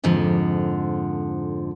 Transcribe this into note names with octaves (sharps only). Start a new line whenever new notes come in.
F2 G#2 D3 F3